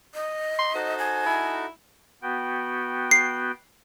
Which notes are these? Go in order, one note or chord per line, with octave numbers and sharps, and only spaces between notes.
D#5
C6
D#4 F#4 A4 C5
G#5
E4
B3 F#4 G5
C7